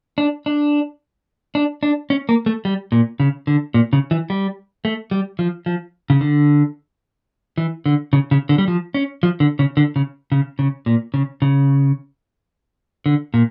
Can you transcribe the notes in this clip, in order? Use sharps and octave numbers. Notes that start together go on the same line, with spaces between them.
D4
D4
D4
D4
C#4
A#3
A3
G3
A#2
C#3
D3
A#2
C#3
E3
G3
A3
G3
F3
F3
C#3
D3
E3
D3
C#3
C#3
D3
G3
F3
C#4
F3
D3
C#3
D3
C#3
C#3
C#3
A#2
C#3
C#3
D3
A#2